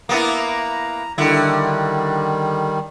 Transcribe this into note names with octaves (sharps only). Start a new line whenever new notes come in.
A#3 B3 E4 A#5
D3 D#3 G3 E4